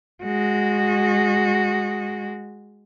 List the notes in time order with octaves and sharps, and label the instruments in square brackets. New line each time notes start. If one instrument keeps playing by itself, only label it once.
[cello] G#3 F#4